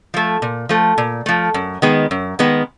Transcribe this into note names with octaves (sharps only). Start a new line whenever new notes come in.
F3 A3
A#2
F3 A3
A#2
F3 A3
F#2
D#3 G#3 B3
F#2
D#3 G#3 B3